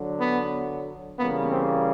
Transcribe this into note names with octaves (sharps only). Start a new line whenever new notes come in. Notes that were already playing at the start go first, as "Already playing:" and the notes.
Already playing: D3 F#3
B3
C#3 E3 G3 A#3 B3
C4